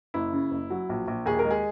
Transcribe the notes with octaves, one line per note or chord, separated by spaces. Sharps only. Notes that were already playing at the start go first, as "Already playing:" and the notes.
F#1 E4
C#3
F#1
F#3
A#1
A#1
D#2 G#4
A#4
G#3
G#4